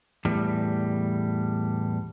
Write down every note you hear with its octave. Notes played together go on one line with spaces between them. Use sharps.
E2 A2 G3